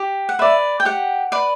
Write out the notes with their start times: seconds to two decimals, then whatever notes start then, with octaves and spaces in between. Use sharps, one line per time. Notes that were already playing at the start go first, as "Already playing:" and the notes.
Already playing: G4
0.29 F#5
0.39 B4 D5 E5
0.80 G5
0.85 G4 F#5
1.32 B4 D5